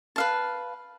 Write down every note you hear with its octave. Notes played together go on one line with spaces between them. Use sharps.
B4 F5 A5